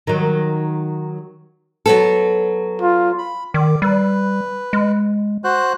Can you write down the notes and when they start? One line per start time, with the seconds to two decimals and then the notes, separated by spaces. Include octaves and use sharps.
0.07 D#3 F#3
1.86 F#3 B3 A4
2.82 F4
3.18 B5
3.54 D#3 D5
3.82 G3 B4
4.73 G#3
5.44 F#4 C5 F#6